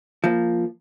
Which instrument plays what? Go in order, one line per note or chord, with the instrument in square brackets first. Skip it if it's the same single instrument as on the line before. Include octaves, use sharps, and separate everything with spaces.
[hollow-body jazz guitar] F3 A#3